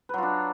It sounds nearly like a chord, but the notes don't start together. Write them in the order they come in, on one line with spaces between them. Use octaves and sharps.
B4 F#3 F4 D4